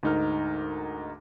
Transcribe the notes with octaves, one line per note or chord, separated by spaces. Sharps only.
D2 G#2 D#4 A#4 F6